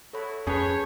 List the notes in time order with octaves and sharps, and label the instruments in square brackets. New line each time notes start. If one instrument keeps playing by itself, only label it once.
[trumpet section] A3 E4 F#4 [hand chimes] A4 C#5 B5
[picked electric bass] F2 C#4 [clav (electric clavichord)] G#4 B4 [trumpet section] C#5 [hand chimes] A5 G6